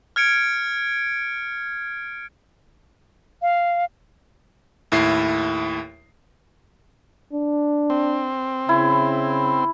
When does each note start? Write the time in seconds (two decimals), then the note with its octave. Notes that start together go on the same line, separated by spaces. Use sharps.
0.16 F6 G#6 C#7 D7
3.42 F5
4.92 D#2 A2 E4 C7
7.33 D4
7.90 C4
8.69 C#3 E4